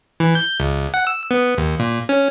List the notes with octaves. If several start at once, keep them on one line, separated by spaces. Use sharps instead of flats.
E3
G6
C#2
F#5
E6
B3
D#2
A#2
C#4